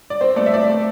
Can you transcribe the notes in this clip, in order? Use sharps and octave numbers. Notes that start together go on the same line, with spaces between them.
D5
C4 C5
A3 D5
E5
C4 D5
A3